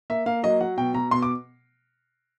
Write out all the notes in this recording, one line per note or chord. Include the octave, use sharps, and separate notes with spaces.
A#3 E5
A#3 F5
F#3 D#5
F#3 F#5
B2 G5
B2 A#5
B2 C6
D6